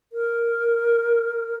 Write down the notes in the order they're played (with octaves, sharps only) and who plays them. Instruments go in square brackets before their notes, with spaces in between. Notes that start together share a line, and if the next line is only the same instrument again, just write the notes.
[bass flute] A#4